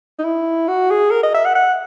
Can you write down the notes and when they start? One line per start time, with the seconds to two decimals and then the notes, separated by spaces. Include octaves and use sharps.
0.19 D#4
0.24 E4
0.68 F#4
0.91 G#4
1.11 A#4
1.23 D#5
1.34 E5
1.45 F#5
1.55 F#5